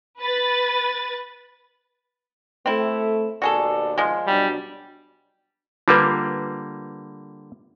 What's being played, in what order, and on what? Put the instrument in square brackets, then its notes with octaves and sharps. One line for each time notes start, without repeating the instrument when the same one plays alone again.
[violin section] B4 A6
[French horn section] A3 [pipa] C4 E4
[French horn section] D#2 B2 D5 [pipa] F#4 G#4 A4
[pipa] F3 G#3
[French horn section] B2 F#3 D4 [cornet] G3
[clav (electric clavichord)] D3 G3 A#3 [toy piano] F4 B4